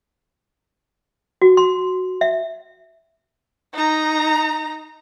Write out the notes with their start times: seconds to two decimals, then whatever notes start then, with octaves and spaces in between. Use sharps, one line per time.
1.42 F#4
1.57 C6
2.21 E5
3.73 D#4 A#5